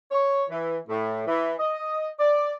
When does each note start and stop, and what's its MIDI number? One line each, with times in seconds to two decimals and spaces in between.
0.12 0.43 73
0.50 0.77 52
0.88 1.21 45
1.27 1.52 52
1.59 2.08 75
2.19 2.52 74